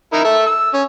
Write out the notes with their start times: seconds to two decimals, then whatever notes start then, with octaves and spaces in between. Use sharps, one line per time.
0.13 D#4 E4 A#4
0.24 A4 E5
0.46 E6
0.74 C#4